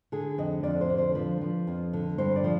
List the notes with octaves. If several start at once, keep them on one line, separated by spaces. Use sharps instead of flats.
D3 G#4
F2 D#5
F2 D5
C5
D3
C5
F3 B4
F3
F2
D3
G2 C5
D5
F3